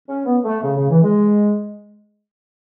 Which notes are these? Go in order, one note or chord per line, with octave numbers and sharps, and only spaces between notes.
C#4
B3
A3
C#3
C#3
E3
G#3